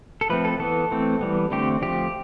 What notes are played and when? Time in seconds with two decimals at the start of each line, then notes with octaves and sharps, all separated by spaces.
0.21 A4
0.30 F3 A3 C4 B4
0.45 A4
0.60 E3 B3 A4
0.91 E3 A3 C4
1.21 E3 G3 B3
1.51 D3 A3 C4 G4
1.82 F3 A3 C4 G4